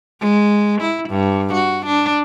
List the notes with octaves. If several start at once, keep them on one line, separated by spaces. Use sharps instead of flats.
G#3
E4
G2
F#4
D4